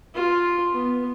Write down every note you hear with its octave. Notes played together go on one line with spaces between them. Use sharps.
F4
B3